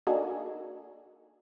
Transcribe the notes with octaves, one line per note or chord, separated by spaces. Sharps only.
A#3 D4 D#4 F#4 G#4 A4